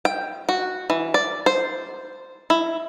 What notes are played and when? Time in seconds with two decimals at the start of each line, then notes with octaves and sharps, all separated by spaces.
0.05 G5
0.49 F#4
0.90 E3
1.14 D5
1.46 C5
2.50 E4